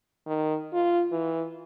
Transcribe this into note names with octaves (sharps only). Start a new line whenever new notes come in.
D#3
F4
E3